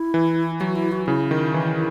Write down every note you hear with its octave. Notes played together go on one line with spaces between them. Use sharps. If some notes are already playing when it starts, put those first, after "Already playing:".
Already playing: E4
E3
F#3 F#4
E4
F#4
C#3 E4
D#3
E3